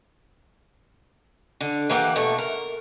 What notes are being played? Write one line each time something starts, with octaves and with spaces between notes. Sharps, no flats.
D3
E3 A#3 G4 F#5
B2 A3
A#4